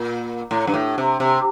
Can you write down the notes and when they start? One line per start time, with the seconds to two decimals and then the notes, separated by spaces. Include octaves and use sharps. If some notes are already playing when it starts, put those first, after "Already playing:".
Already playing: A#2
0.51 A2
0.67 G2
0.74 A2
0.98 C3
1.20 C3